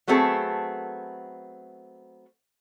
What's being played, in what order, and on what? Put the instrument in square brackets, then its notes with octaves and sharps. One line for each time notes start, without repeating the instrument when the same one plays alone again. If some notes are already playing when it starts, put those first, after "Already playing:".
[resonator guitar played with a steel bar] F#3 A3 B3 C4 G#4 A4